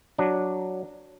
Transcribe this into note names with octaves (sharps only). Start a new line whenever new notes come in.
F#3 D4